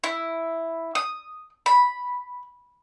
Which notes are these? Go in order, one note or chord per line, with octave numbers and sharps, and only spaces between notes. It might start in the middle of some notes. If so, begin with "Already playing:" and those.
E4
D#6
B5